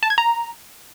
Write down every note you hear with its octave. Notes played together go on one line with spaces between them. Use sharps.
A5
G#6
A#5